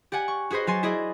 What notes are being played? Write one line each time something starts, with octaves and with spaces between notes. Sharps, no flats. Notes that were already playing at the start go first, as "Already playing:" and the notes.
G4 D5 F#5 G#5
C#6
F#4 G#4 B4 C5 D#5
F#3 F#4 G#5 C6 A6 D#7
E4 G#4 D5 D#5